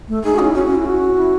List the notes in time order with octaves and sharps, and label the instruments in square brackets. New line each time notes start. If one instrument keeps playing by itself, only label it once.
[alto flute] A3
[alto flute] D#4 [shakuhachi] G#4
[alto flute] F#4
[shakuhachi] C#4
[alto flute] E4
[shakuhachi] C#4 [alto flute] F#4
[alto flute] F#4
[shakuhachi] C#4
[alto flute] E4
F#4
[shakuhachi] E4